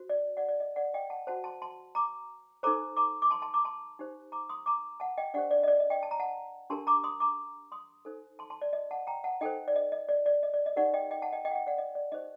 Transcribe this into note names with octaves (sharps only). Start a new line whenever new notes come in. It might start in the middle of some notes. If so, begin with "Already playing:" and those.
Already playing: F#4 C5
D5
D5 F#5
D5
D#5
D5 F#5
D#5 G5
F#5 A5
F#4 C5 F#5 A5
A5 C6
A5 C6
A#5 D6
D#4 A4 C5 A#5 D6
A#5 D6
D6
A5 C6
A5 C6
A#5 D6
A5 C6
D#4 G4 C5
A#5 D6
C6 D#6
A#5 D6
F#5 A5
D#5 G5
D4 G4 C5 D5 F#5
D5
D#5
D5
D#5
D#5 G5
A5
A#5
F#5 A5
D4 G4 A#4 A5 C6
A#5 D6
C6 D#6
A#5 D6
C6 D#6
D#4 A4 C5
A5 C6
A5 C6
D5
D#5
F#5 A5
G5 A#5
F#5 A5
D#4 A4 C5 D#5 G5
D5
D#5
D#5
D5
D5
D#5
D5
D#5
D#4 G4 A#4 D5 F#5
D#5 G5
D#5 G5
F#5 A5
D#5 G5
D#5 G5
F#5
D#5 G5
D5 F#5
D#5
D5
D#4 G4 C5 D#5